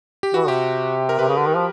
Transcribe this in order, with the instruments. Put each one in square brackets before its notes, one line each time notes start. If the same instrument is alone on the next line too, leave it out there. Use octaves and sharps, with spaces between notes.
[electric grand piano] G4
[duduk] E3 [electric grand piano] F#4
[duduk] C3 [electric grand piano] G4
[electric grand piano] A#4
[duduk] C3 [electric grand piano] B4
[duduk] C#3
D3
D#3
F3